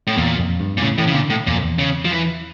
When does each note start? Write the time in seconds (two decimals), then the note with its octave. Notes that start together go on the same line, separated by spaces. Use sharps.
0.07 A2
0.17 E2 A#2
0.39 F2
0.60 G2
0.78 A#2
0.82 A2 C#3
0.98 A2 E3
1.07 C#3
1.14 A#2 D3
1.30 A2
1.47 E2 A#2
1.55 F2
1.63 E2
1.79 C#3
2.05 F3
2.11 E3